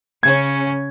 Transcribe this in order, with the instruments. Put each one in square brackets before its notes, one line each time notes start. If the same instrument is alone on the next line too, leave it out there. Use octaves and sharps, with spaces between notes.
[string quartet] C#3 C#4 [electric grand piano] G#6